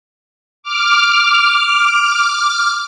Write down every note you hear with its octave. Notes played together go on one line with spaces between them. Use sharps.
D6 F6